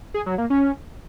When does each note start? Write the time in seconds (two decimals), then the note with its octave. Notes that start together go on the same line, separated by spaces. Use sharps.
0.14 G#4
0.26 F#3
0.38 A#3
0.50 C#4